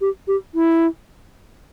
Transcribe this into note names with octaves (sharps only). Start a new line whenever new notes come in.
G4
G4
E4